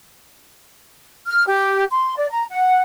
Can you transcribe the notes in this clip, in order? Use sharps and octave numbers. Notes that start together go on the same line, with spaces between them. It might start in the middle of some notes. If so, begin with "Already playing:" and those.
F6
G4
C6
D5
A#5
F#5